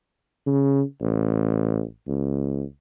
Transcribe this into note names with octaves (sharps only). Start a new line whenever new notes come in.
C#3
A1
C#2